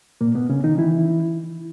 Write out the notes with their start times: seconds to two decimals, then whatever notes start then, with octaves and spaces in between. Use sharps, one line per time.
0.21 A#2 A#3
0.35 B2 B3
0.50 C#3 C#4
0.64 D#3 D#4
0.78 E3 E4